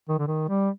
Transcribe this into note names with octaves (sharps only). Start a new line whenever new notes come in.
D#3
D3
D#3
G3